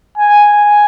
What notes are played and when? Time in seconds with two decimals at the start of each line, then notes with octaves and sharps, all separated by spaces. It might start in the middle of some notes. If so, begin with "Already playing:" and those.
0.18 G#5
0.52 G#5